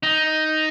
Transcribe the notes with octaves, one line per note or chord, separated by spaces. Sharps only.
D#4